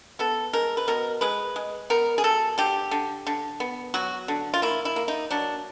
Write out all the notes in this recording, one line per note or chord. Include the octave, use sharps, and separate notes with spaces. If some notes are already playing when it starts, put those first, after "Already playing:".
B3 A4
G#3 A#4
B4
B2 A#4
G#3 B4
G#3
B3 A#4
G#4
F#3 A4
D3 G4
D3
D3
B3
F#3 F#4
D3
F4
A#3 E4
E4
A#3
D#4
F#3 D4